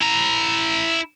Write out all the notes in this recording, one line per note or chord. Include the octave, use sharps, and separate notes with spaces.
E4 A#5